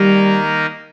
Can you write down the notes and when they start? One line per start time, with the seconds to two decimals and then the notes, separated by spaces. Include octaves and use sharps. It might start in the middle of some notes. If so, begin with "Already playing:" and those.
Already playing: D#3 G3 A#3 D#4 A#4